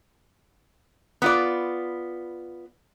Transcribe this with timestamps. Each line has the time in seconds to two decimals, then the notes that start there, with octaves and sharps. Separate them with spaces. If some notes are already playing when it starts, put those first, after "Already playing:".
1.22 B3 F4 D5